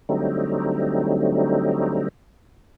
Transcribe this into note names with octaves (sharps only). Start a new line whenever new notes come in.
D3 F#3 G3 A3 C4 D#4